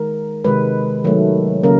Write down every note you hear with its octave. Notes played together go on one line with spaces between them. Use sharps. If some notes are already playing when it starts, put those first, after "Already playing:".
Already playing: D#3 G#3 A#4
C3 D#3 G#3 B4
D#3 F#3 A3
C#3 F#3 A#3 A#4